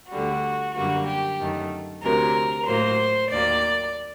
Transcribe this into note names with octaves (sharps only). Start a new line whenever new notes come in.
D2 D3 G3 F#4
F#2 D3 G3 A#3 F#4
G4
F#2 D#3 A3
D2 C3 F#3 A#4
A2 F#3 A#3 C5
D#2 D#3 F#3 A#3 D5